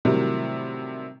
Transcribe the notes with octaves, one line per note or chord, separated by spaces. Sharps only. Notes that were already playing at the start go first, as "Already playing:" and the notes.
A2 C3 D#3 F#3 G3